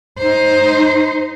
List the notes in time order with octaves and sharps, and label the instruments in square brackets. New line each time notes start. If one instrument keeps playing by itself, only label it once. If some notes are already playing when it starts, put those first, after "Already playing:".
[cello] D#4 C5